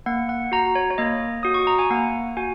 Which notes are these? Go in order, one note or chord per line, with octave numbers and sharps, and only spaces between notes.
A#3 F#5
F#5
F#4 A#5
C#5
C#5
A#3 D#5
F#4 D#6
C#6
A#5
G#5
A#3 F#5
F#4 G#5